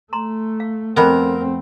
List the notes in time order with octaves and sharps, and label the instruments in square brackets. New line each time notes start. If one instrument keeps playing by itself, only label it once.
[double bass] A3 [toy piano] A#5 C6
[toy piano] F5
[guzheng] F2 B3 [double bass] A3 C4 [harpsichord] A#4 [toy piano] D#5 B5